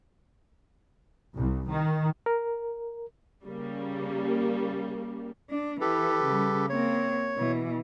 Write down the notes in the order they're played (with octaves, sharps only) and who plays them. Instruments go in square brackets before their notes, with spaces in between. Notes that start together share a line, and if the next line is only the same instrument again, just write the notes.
[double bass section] C2
D#3
[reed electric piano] A#4
[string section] C#3 G3 A#3
[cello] D4
[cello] E3 [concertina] G4 A4 B4
[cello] C#3 G3
[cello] A#3 C4 [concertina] C#5
[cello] B2 E3